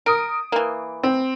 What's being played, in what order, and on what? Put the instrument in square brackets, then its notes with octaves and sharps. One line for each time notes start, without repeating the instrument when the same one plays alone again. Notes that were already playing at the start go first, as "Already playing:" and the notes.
[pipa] A#4 [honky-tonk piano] D#6 D7
[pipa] E3 A#3
[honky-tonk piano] C4